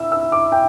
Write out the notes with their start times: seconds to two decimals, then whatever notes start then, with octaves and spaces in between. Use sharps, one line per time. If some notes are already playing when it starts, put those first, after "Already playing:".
Already playing: E4 E6
0.12 E6
0.32 D6
0.52 G5